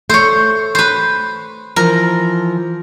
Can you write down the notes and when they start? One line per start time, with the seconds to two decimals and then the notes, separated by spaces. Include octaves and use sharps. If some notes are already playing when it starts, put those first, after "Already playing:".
0.09 A3 C5 C#5
0.75 B4 C5
1.76 E3 F3 A#4